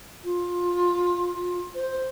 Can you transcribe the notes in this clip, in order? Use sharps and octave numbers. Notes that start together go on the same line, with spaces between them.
F4
C5